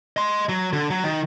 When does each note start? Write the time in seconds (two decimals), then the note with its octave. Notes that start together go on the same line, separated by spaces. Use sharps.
0.17 D#5 C6
0.49 F#3
0.73 D3
0.90 F#3
1.04 D#3